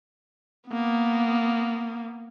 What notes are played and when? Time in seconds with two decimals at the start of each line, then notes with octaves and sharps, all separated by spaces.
0.68 A#3 B3